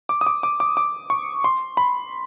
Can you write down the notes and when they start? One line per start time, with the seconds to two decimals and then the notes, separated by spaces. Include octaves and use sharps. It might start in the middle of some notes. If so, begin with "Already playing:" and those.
0.09 D6
0.21 D#6
0.26 D6
0.43 D6
0.60 D6
0.77 D6
1.10 C#6
1.44 C6
1.77 B5